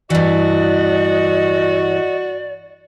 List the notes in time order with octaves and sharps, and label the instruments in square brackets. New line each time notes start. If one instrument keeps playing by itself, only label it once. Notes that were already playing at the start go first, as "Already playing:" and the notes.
[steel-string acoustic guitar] G2 E3 [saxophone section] F#4 [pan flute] D5 [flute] D#5